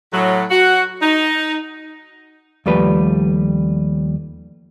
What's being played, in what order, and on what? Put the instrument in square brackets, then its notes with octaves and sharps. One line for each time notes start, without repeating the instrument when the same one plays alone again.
[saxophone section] A2 F#3
F#4
D#4
[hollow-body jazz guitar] D#2 F3 G3 A3 B4